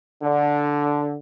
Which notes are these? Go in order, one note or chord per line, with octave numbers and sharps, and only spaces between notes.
D3